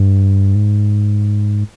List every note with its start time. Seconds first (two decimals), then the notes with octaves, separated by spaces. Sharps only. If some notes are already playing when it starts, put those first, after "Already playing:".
Already playing: G2
0.55 G#2